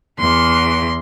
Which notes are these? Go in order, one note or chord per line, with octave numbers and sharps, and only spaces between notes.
E2 C6